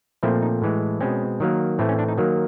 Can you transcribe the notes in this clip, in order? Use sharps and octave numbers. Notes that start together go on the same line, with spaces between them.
A#2 F3 A3 C4 E4
D#4
A2 E3 G#3
B2 G#3 C4 C#4
D#3 F#3 A#3
A2 E3 A3 C4
C#4
D4
D#4
D#3 F#3 A#3